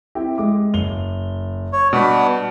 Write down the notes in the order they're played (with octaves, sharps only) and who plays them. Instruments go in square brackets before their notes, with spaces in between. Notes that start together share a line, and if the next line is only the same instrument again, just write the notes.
[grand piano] C4 E4 G4
G#3 D6
F#1 F7 G7
[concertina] C#5
[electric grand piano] B2 [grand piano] G3 B6 [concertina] B3 D4